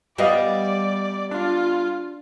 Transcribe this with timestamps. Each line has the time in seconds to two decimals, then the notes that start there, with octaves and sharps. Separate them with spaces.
0.18 G3 B3 G4 D5 D#5 F5
1.31 D4 F4